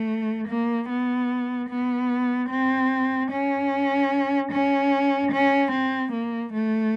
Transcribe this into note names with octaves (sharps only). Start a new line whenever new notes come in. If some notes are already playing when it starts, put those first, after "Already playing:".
Already playing: A3
A#3
B3
B3
C4
C#4
C#4
C#4
C4
A#3
A3